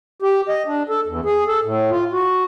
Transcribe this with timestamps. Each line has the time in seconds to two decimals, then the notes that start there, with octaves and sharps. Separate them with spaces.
0.22 G4
0.49 D#5
0.67 D4
0.89 A4
1.07 E2
1.25 G#4
1.48 A4
1.65 A2
1.91 F4
2.12 F#4